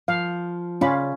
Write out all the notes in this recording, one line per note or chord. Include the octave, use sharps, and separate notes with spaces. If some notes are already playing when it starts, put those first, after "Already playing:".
F3 F5
C#3 C#4 F4 D5 F5 B5